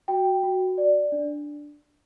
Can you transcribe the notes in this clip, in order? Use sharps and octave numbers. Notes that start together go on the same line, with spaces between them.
F#4 G5
F#4
D5
D4